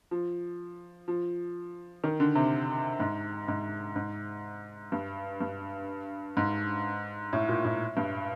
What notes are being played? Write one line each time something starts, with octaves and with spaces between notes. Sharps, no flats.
F3
F3
D#3
D3
C3
G#2
G#2
G#2
G2
G2
G#2
A2
A#2
A2
G2